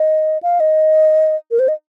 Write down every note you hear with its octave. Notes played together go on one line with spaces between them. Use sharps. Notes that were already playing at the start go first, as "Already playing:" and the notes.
Already playing: D#5
F5
D#5
A#4
C5
D#5